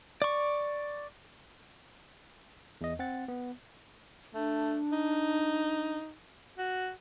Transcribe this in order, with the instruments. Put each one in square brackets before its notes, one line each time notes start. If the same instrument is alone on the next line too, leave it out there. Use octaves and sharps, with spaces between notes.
[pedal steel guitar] D5 C#6
[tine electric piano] E2 D#5
C4 F#5 A6
B3
[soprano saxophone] A3 [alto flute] D4
[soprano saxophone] D#4
F#4